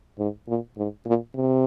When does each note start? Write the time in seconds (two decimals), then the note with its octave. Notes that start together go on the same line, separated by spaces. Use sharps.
0.19 G#2
0.48 A#2
0.77 G#2
1.06 A#2
1.36 C3